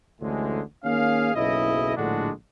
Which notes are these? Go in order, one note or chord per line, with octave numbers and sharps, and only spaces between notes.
A1 D2 A2 D3 G#3
D#3 A#3 C#4 G#4 F5
F#1 B1 C#3 E4 D#5
A#1 A2 D3 G#3 D4 F#4